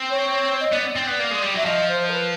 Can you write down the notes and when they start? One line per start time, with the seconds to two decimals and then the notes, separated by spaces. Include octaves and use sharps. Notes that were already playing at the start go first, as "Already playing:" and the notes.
Already playing: C4
0.10 C#5
0.60 D#5
0.72 B3 D5
0.96 C4
1.07 B3
1.20 A#3
1.31 G#3
1.42 G3
1.54 F#3 E5
1.65 F3 D#5
1.89 C5
2.08 A#4
2.13 B4